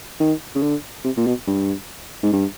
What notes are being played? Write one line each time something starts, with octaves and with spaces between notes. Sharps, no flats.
D#3
C#3
D3
C3
A#2
B2
G2
G#2
G2